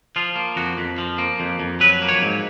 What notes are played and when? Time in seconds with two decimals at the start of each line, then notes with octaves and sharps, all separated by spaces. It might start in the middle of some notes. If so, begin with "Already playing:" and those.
0.16 F3 F4
0.36 A#3
0.56 F2 F#4
0.78 F2
0.98 F3
1.18 A#3
1.40 F2
1.60 F2
1.80 F#3 B4
2.02 A#3
2.09 C#5
2.22 G#2